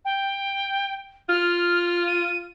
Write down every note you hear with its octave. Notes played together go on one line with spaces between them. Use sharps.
G5
F4 F6
D#7